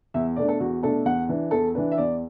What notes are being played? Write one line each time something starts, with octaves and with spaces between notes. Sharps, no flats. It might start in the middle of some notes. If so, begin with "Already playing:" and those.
E2 E5
B2 A3 D4 D5
A4
E2 F#4
B2 A3 D4 A4
E2 F#5
E3 D4
E2 A4
E3 D4 B4
E5
E2 D5